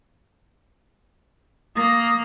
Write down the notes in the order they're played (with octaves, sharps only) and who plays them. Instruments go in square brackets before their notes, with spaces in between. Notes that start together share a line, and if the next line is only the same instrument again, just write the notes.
[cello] A#3 [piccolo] D#6